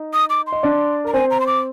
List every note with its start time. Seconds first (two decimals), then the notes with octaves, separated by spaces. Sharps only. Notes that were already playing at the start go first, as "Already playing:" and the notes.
Already playing: D#4
0.13 D#6
0.30 D6
0.47 C6
0.52 D#5
0.63 D4 D5
1.04 A#4 A#5
1.13 C4 C5 G#5
1.30 A#5
1.40 C6
1.47 D6